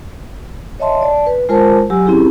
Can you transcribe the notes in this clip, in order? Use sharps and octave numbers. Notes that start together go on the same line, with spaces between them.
C#5 D#5 E5 A5 C6
D5 A5
B4
G#3 F4 A#4 C5 A5
F#3 G4 G#5 E6
C4 C#4 E4 G4 G#4